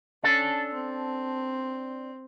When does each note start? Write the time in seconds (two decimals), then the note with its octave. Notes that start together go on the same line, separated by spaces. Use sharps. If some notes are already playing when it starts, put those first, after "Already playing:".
0.24 C#4 D4 A4
0.74 C4